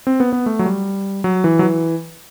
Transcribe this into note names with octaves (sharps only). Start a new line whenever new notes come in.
C4
B3
B3
A3
F#3
G3
F#3
E3
F#3
E3